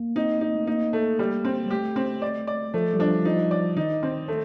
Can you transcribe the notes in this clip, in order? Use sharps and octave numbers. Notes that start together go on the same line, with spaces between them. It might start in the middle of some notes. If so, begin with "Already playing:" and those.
Already playing: A#3
C4 D#4
D#4
A3
A#3 D#4
A3
G3
C4
G3
A3 G4
C4
D5
D5
F3 A3
G3
F3 D4
F3 D#4
D5
D#3 D#4
C4
A3